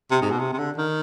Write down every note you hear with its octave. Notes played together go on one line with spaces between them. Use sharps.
C3
G#2
B2
C3
C3
D3
D#3